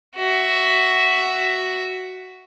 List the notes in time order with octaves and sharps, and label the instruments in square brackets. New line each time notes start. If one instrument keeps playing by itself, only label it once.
[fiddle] F#4 E5